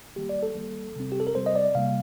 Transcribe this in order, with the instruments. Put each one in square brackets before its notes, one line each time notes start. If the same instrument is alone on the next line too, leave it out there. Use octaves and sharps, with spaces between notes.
[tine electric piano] D#3 G3 A#3 G4
D5
A4
D#3 G3 A#3
C3 G3 C4
G4
A4
A#4
C3 G3 C4 C5
D#5
D5
C3 G3 A#3 F5